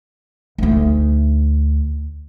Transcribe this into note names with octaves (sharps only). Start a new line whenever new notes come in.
D2 D#4